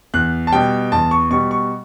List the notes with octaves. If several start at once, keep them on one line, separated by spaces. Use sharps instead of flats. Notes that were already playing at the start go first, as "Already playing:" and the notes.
E2 F#6
A5
B2 G3 G5
E2 A5
C#6
B2 G3 C#6
C#6